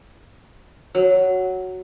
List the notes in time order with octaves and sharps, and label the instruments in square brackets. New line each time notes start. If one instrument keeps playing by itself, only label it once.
[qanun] F#3